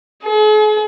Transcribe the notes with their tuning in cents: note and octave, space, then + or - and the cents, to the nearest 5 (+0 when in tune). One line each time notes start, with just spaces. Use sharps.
G#4 +45